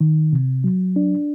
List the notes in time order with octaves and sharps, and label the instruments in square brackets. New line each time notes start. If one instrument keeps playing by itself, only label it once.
[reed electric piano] D#3
C3
F#3
D4